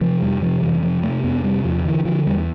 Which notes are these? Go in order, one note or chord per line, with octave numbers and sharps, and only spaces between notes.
C3 F3
F2 G3
C3 F3
F2 E3
C3 F3
C3 A3
F2 B3
C3 G3
E2 F3
D3 E3
D3 F3
E2 G3